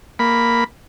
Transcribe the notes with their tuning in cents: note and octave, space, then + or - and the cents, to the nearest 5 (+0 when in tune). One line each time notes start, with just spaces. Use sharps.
A#3 +0 B5 +0